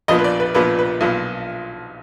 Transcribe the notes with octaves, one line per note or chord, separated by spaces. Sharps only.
A#1 A#2 F3 B3 D#5
B4
D5
B4
A#1 A#2 F3 B3 B4
B4
B1 A#2 F3 B3